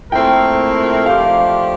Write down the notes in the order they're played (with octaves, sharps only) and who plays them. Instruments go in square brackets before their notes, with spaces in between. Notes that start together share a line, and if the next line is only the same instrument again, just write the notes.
[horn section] A#2 A3 C4 E4 A#4 [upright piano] G5
[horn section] F3 A3 D4 G4 [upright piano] F5